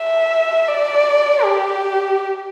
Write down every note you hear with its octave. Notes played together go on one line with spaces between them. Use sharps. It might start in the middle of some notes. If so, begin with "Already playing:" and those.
Already playing: E5
D5
G4